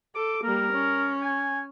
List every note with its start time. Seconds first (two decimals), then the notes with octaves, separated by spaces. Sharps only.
0.15 A4 D6
0.44 G3 A#3 A#4
0.72 C#4
1.22 G#5